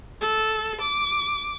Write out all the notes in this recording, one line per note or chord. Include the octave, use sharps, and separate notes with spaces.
A4
D6